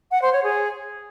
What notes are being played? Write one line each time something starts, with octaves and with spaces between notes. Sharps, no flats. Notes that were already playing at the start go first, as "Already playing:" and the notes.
F#5
C5
C#5
G#4